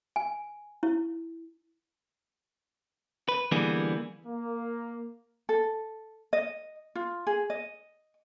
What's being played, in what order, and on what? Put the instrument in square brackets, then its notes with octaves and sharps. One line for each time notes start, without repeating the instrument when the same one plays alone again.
[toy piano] G#5
E4
[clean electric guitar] B4
D3 E3 G3 A#3 B3 G#4
[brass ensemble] A#3
[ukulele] A4
D#5
F4
G#4
D#5